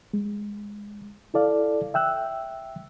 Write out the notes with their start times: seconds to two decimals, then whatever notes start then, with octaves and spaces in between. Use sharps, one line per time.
0.13 G#3
1.34 E4 A4 D5 F5
1.94 E5 G5 E6 F#6